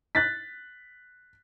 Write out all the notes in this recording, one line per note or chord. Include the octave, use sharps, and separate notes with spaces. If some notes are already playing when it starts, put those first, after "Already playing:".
F#6 A6 B6